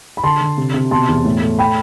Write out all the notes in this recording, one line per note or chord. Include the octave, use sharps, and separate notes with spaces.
B5
D3 A5 C6
D3
C3
C3
B2 A5 C6
E2
A2
A3
G5 B5